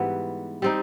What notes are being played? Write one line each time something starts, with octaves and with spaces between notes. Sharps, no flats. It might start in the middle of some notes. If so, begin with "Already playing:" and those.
Already playing: G#2 E3 G3 B3
G3 C4 D#4